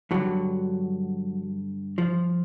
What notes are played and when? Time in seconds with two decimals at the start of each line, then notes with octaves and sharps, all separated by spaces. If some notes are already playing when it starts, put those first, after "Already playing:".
0.11 G2 D3 F#3
1.98 F3